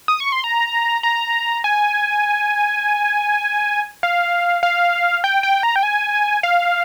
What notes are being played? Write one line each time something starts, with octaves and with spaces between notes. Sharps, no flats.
D#6
C#6
C6
A#5
A#5
G#5
F5
F5
G5
G5
A#5
G5
G#5
F5